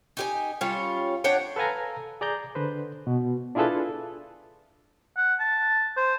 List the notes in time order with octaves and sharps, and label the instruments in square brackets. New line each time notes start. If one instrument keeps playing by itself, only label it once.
[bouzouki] D#4 G4 G#5
G3 C#4 F4 C#5
D4 C#5 F#5 G5
[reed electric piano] A4 B4 F5 G#5 A#5
G#4 D5 A#5 G6
D3 B4 C5
B2
D4 E4 F4 G#4 A4 B4
[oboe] F#5
A5
C5